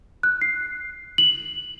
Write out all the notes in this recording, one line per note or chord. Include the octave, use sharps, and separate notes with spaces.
F#6
C7
F#7